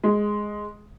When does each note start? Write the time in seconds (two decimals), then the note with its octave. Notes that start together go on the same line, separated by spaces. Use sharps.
0.04 G#3